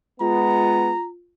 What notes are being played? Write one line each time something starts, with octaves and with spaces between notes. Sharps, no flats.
G#3 B3 F4 A#5